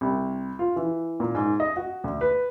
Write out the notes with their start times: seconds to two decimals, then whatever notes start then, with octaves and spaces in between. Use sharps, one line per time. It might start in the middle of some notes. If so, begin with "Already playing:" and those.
0.01 C2
0.59 F4
0.76 E3
1.20 A#2
1.35 G#2
1.60 D#5
1.77 F#4
2.04 D2
2.21 B4